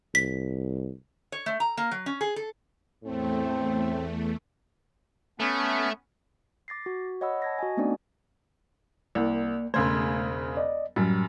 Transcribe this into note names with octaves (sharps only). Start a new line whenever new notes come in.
C2 B6
C#5
A3
A#5
A#3
F#3
C#4
G#4
A4
E2 A2 A3 C4
A3 B3 C#4
D6 A6 A#6 C7
F#4
C#5 D#5 F#5 B5 E6
A5 G#6 A#6
F#4 D#5 G#5
A3 B3 C4 D4 D#4 D5
C2 A#3 D5
E1 C#3 A3 C5 G#6
D5 D#5
F#2 A2 F#3 G3